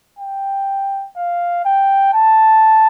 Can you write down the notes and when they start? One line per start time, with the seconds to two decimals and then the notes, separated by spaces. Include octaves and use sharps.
0.19 G5
1.17 F5
1.65 G5
2.14 A5